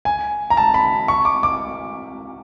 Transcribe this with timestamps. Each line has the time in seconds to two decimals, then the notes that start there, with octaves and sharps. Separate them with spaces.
0.05 G#5
0.50 A#5
0.57 A5
0.74 B5
1.08 C#6
1.25 D6
1.43 D6